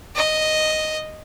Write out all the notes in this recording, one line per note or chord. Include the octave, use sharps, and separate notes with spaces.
D#5